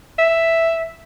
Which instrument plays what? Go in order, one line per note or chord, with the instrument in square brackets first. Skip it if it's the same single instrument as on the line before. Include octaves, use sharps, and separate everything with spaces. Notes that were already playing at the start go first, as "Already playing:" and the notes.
[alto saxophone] E5